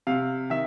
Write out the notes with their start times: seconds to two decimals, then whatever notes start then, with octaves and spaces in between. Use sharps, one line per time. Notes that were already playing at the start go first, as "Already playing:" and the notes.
0.07 C3 F5
0.50 D#3 E5